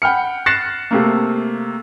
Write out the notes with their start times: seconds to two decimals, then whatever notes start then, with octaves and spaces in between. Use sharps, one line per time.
0.02 F#5 G5 B5 F6 C#7
0.46 F#6 A6 A#6 C7 C#7 E7
0.91 C3 A3 A#3